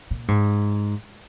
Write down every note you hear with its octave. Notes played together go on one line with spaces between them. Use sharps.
A#2
G#2